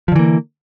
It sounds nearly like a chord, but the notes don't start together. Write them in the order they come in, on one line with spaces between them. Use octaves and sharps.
F3 D3 E3 A#3